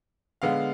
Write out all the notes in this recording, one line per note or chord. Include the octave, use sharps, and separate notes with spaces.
D3 G#3 B3 F5